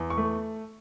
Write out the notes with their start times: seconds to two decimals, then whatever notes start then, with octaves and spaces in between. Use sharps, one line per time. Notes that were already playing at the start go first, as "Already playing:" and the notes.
Already playing: E2
0.10 C#6
0.17 A3